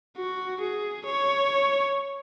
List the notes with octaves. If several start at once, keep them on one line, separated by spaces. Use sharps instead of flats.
F#4
G#4
C#5